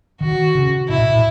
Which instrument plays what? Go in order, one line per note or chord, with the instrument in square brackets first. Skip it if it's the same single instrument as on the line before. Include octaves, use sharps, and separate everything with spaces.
[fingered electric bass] D#3 [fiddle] F#4
[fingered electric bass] C#3
[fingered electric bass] B2 [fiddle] E4
[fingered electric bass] A#2
A#2